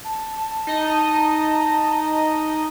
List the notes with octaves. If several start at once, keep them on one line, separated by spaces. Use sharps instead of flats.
A5
D#4 D#5